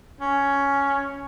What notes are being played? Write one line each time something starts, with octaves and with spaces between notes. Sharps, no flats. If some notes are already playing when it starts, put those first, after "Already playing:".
C#4